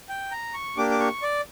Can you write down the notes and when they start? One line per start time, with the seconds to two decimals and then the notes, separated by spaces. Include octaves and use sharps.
0.09 G5
0.31 A#5
0.54 C#6
0.77 A#3 D4 G4 D6
0.91 D6
1.00 C#6
1.22 D5